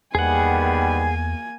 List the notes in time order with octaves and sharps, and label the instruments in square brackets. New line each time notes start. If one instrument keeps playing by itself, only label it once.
[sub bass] E2 [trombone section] D#3 G3 B3 [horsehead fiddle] A#3 G#5 [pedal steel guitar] G#4 F#5